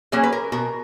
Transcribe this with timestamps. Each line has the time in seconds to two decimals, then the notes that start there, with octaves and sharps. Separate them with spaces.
0.12 F#3 A#3 C#4 G#4
0.23 B4
0.32 A#4
0.52 B2 A#4